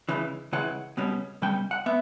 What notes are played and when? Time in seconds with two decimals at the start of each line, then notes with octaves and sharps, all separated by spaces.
0.09 C#2 C#3 E3
0.53 C#2 C#3 E3 F#5
0.97 C#2 B2 G3 C#4
1.42 C#2 B2 G3 C#4 G5
1.71 F#5
1.86 B3 E5